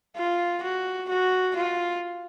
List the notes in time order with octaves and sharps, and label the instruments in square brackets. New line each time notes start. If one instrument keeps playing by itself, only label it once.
[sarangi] F4
F#4
F#4
F4